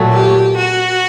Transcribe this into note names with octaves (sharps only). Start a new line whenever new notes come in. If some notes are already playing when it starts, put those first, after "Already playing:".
Already playing: A#2 F#3 A3
G4
F#4